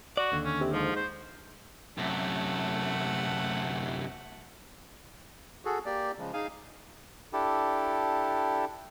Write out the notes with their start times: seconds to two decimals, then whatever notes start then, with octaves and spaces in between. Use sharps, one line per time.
0.17 F#4 D5
0.32 D#2 D3
0.44 C#4
0.60 C3
0.73 G#2 F3
0.96 C5
1.98 F#2 C3 A3 F#5
5.65 F#4 G#4 A4
5.86 A#3 G4 D5
6.18 C#3 F3 G#3
6.33 D#4 G#4 F5 G#5
7.33 D4 E4 G4 A4